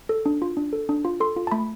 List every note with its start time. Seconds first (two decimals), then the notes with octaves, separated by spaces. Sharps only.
0.09 A4
0.26 D4
0.42 F4
0.57 D4
0.73 A4
0.89 D4
1.05 F4
1.20 A4 C6
1.36 F4
1.47 A5
1.52 A3 B5